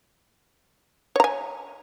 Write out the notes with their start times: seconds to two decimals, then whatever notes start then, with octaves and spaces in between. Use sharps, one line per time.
1.16 C#5
1.20 A#5
1.24 G#5